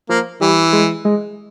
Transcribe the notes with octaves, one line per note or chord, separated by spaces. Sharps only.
F3 A#3
E3 G3
G#3
G#3